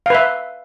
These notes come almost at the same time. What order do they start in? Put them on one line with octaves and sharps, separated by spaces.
F5 B4 E5